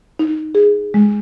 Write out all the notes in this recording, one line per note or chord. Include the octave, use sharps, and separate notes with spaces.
D#4
G#4
G#3